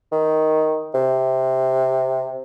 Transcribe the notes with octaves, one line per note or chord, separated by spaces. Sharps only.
D#3
C3